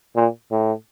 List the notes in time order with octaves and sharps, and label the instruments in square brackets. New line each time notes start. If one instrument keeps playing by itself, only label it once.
[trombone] A#2
A2